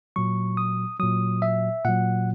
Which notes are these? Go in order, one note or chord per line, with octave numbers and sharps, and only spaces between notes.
A#2 F#3 C#6
D#6
A#2 F#3 D#6
E5
A#2 F#3 F#5